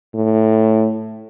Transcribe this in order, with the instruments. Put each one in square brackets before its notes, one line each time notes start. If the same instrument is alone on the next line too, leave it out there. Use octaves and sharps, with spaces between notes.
[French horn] A2